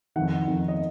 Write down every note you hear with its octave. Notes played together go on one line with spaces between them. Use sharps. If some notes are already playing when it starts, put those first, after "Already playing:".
F2 D#3 F#5
F2 D#3
D#5